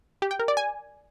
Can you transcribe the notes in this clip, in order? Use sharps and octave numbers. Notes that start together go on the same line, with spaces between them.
G4
G5
A#4
D5
G#5